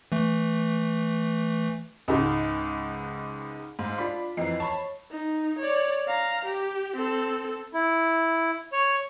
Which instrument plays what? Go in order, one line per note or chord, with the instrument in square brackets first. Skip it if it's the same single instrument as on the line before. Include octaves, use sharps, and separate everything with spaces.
[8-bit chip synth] E3 A3
[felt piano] C#2 G#2
[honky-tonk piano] G#2 [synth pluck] F5
[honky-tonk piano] D4 [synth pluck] F4 B5
[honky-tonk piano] F2 E3 A#5 [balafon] D#5 [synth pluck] C7
[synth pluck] C#5 [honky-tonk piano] A5 B5
[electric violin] D#4
C#5 D5
F5 A#5
G4
C4 A4
[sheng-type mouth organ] E4
C#5